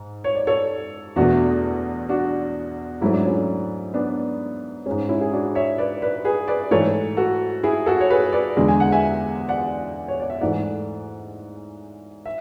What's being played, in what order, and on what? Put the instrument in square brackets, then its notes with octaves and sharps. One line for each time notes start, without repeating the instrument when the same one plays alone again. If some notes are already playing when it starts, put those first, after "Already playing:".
Already playing: [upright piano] G#2
C#5
D5
A4 C#5
E2 B2 A3 D4 F#4
D4 F#4
G#2 F#3 A3 E4
D4
C#4 E4
B3 D4
G#2 G#3 C#4
C#4 E4
G#4
D4 F#4
C#5 E5
B4 D5
B4 D5
G#4 B4
B4 D5
G#2 E3 A3 A4 C#5
F#4 A4
E4 G#4
F#4 A4
C#5
G#4 B4
B4 D5
E2 D3 G#3
G#5
F#5
E5 G#5
D5 F#5
C#5
D5
E5
G#2 E3 A3 D5 F#5
E5